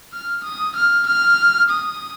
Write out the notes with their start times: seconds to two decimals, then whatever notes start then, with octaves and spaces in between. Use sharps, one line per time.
0.13 F6
0.44 D#6
0.75 F6
1.06 F6
1.69 D#6